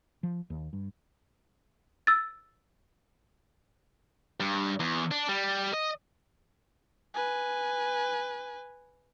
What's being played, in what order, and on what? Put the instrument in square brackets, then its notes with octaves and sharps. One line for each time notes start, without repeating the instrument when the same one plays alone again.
[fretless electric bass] F3
D#2
G2
[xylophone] E6 A6
[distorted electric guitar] G2
E2
D4
G3
D#5
[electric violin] B4 G#5